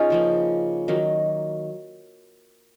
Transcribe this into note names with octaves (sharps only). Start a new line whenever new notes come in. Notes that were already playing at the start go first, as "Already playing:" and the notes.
Already playing: C#4 D#4 F4 G#4
C#3 F3 A#3
D#3 F#3 A#3